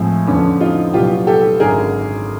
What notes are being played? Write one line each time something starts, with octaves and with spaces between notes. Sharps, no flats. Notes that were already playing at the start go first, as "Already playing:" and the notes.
Already playing: A2 F3 G#3 C4
F2 D3 F3 B3 C#4
D#4 F4
C2 A#2 F#3 B3 F4 G4
G4 A4
G#1 F#2 D3 G#4 A#4